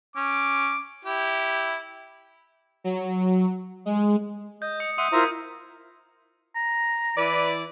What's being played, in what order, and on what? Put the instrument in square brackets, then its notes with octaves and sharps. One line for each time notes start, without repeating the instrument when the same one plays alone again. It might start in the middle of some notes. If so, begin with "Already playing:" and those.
[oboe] C#4 [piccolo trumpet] D6
[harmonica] E4 G4
[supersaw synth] F#3
G#3
[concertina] D#5 [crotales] G6
[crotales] D#6 C#7
[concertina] E5 F#5 C6 [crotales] D#6 D#7
[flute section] E4 F4 A#4 [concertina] C5 E5 A#5
[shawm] A#5
[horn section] E3 E4 D5 [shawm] B4